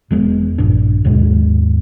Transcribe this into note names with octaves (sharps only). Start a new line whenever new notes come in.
E1 G#3 A3 B3
A#1 G2 D4
D#2 G#2 B2 G#3